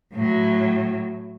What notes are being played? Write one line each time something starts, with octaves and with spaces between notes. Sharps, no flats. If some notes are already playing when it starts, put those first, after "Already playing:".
A2 F#3